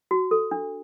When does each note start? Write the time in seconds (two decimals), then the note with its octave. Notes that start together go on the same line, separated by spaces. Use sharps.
0.11 F#4
0.31 A4
0.51 D4